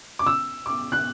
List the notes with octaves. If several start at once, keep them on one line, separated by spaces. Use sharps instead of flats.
D6
E6
D6
F#6